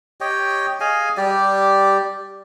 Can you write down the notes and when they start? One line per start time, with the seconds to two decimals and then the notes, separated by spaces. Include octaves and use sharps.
0.21 G4 C#5 D#5 G5
0.80 G#4 D#5 F5 G#5
1.17 G3 G4 D5